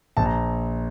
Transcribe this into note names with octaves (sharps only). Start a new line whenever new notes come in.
A#1 A5
A#5